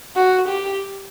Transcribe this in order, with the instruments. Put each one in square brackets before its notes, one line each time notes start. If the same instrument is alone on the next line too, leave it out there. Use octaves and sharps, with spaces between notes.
[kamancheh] F#4
G4